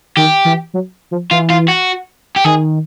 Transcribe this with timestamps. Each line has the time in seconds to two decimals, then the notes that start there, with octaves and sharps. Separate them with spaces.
0.17 D#3 G4
0.45 E3
0.74 F#3
1.11 F3
1.31 E3 F4
1.50 F4
1.68 F#4
2.36 G4
2.44 D#3 G#4